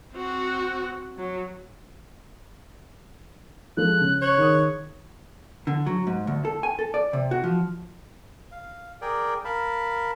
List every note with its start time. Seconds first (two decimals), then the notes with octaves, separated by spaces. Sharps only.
0.13 C4 F#4
1.18 F#3
3.77 F3 G#3 A4 F#6
4.00 C#3
4.22 C#5 F#6
4.37 D#3 G#4 D#6
5.67 D3
5.86 F#3
6.07 G#2
6.27 D2
6.45 A4
6.63 G#5
6.79 A4
6.94 D5
7.13 C3
7.31 F#4
7.44 F3
8.52 F5
9.02 G#4 A#4 D5 G5
9.45 A#4 F5 A5 B5